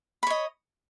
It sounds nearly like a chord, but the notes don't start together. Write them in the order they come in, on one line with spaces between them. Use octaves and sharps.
B5 C#5 D#5